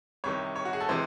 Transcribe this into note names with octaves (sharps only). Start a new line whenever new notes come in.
C2 C3 D#3 C#5
C#5
F#4
G#4
A4
C3 E3 G#3 C5